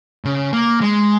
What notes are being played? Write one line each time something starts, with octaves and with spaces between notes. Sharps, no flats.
C#3
A#3
G#3